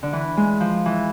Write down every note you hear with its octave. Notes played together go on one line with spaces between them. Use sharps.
D3
E3
G#3
F3
E3